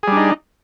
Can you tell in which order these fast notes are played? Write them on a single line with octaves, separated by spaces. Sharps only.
G#4 G3 D4 D#4